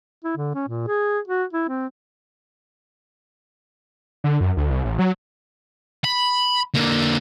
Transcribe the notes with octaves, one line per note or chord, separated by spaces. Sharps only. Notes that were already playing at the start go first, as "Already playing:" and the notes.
E4
D3
C#4
A#2
G#4
F#4
E4
C4
D3
F#2
D2
C2
A1
F#3
B5
D3 A#3